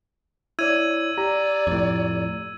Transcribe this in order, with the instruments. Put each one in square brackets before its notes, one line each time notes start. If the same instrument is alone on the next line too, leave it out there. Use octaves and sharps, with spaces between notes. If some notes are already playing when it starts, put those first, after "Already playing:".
[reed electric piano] E4 C#5 D5 [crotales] E6 G#6 D#7
[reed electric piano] G4 A#5 [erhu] D5
[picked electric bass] F2 A2